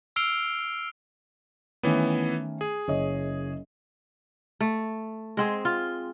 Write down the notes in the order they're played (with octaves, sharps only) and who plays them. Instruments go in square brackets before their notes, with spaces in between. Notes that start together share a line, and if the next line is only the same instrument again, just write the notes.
[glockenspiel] E6 F6 C7 D7 F7 G7
[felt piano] D#3 A3 C#4 [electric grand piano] E3 B3
[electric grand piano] G#4
[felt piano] F#1 C#5 D#5
[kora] A3
G#3 C4 G#4
F4